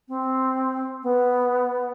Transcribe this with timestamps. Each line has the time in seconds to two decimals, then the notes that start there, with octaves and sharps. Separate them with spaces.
0.08 C4
1.03 B3